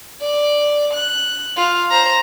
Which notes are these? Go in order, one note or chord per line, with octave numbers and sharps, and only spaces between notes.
D5
F#6
F4
C5 A#5